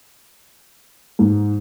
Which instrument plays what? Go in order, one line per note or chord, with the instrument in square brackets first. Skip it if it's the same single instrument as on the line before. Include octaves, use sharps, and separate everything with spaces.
[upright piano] G#2